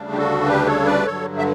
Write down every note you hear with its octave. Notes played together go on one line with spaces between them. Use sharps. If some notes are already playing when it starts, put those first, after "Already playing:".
Already playing: D2 C#3 G3 D4
G4
F#4 A4
G4 B4
A4 C#5
B4 D5
G2 D3 F#3 A4 C#5
E5